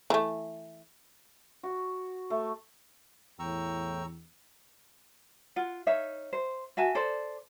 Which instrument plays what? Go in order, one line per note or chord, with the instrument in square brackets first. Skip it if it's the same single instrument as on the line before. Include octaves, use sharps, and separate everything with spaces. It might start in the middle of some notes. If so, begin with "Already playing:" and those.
[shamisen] E3 A3
[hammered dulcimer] F#4
A3
[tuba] E2 [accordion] A2 G5 [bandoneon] A#5 C#6 E6
[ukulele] F4 F#5
D#4 C#5 E5 F5
C5
F#4 E5 G#5 A5
A4 C5 D5